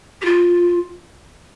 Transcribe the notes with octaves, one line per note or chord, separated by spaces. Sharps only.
G4
F4